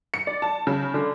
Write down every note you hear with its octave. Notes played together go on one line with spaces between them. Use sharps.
C#7
D5
A5
C#3
D3